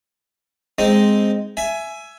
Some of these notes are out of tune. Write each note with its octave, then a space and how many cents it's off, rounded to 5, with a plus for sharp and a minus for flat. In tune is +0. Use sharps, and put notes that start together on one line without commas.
G#3 +0 C4 +0 D#4 +0
E5 +15 G#5 +15